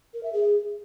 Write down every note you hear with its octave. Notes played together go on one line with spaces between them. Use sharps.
A#4
E5
G#4